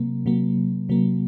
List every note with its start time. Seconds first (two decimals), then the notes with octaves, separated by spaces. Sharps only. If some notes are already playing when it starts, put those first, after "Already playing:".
Already playing: C3 F#3 A#3
0.26 C3 F#3 A#3
0.89 C3 F#3 A#3